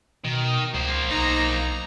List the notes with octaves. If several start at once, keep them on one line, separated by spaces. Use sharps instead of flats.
B2 D#3
C#2 A#3 C5
B1 D#4 A#5